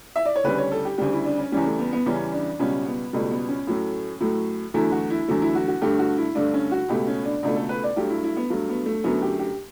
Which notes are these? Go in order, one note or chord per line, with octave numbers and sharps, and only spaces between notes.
E5
D5
C#5
D2 C#3 G3 B4
C#5
A4
G4
D2 C#3 G3 G4
E4
D4
C#4
E2 C#3 E3 G3 C#4
A3
B3
B3
E2 C#3 E3 G3 C#4
D4
C#2 B2 G3 C#4
B3
C#2 B2 G3 A3
B3
C#4
A2 F#3 A3
A2 F#3 A3
E2 D3 F#3 A3 E4
F#4
E4
E2 D3 F#3 A3
E4
F#4
F#4
G2 D3 A3 G4
F#4
E4
G2 D3 A3 D4
C#4
F#4
C#2 B2 A3 G4
C#4
D4
C#2 B2 A3 D4
A4
B4
D5
G2 F#3 A3 G4
E4
E4
B3
G2 F#3 A3
B3
A3
F#2 D3 F#3 A3 B3
G4
G4